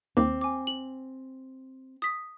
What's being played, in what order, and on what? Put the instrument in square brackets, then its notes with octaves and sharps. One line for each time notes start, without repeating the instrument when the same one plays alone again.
[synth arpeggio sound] D#2 [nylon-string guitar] C4 [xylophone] D6
[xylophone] G#5 D6
F#7
D#6 B6